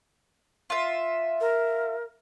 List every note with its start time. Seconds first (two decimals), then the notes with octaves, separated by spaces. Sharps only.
0.70 F4 E5
1.41 A#4